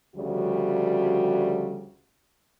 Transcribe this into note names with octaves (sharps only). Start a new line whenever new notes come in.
D2 C#3 F3 G3 F#4